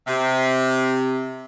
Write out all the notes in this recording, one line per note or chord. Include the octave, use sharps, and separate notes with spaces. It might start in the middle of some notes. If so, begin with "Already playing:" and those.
C3